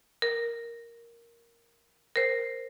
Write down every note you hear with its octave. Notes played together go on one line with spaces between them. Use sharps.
A#4
A#4 C5